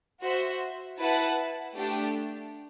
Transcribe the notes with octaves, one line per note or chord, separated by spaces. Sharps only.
F#4 C5 E5
E4 B4 F#5 A5
A3 D4 G4